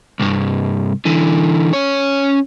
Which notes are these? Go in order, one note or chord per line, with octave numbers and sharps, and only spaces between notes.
C2 G2
D3 E3
C#4 C#5